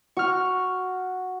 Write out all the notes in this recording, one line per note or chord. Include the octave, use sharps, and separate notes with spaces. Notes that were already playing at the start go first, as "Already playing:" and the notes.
F#4 C#6 F6